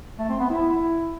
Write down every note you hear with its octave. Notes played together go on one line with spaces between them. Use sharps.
A3
C4
B3
E4